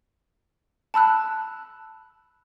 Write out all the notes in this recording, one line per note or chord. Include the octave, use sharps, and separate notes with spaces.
A5 B5 E6 F#6